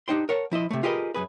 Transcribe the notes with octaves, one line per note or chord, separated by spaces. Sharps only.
D4 D#4 G4 C5 G5 C6
A#4 C#5 F#5 A5
F3 E4 C5 D#5
C3 A3
F4 G4 G#4 A#4 B4 D#5
F#2 C3 G#4 B4